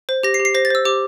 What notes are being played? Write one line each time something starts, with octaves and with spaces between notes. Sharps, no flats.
C5
G4 A#6
C7
G4
C7
C5 A#6
A6
C5 E6
G4 D6